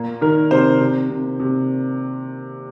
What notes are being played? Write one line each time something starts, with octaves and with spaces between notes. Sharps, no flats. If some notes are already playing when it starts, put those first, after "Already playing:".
Already playing: A#2 A#3
D#3 A#4
C3 C5
C3
C3
C3